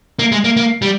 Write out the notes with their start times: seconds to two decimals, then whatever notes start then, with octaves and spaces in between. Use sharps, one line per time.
0.19 A#3
0.32 G#3
0.44 A#3
0.57 A#3
0.82 G3